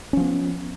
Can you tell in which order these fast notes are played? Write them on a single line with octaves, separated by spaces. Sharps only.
C#4 F3 B3